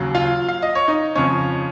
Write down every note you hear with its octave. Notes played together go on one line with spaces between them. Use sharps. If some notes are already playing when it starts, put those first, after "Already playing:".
Already playing: D#2 C#3 F#3
F4 F5
F5
D#5
C#5
D#4 D#5
F2 C#3 F3 C#4 C#5